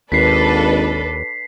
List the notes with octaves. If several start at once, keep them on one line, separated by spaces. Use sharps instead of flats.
G#1 D#2 D4 A4 B4 B6 C7